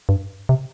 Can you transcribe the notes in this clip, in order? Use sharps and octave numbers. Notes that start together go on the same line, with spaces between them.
G2
C3